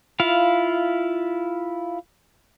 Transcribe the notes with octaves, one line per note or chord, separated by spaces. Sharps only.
E4 F4 F5